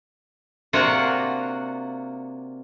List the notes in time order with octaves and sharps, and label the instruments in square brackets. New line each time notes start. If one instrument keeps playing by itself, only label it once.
[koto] C3 A#3 D4 F4 F#4 F#5